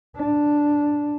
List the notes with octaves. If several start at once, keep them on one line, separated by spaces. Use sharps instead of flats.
D4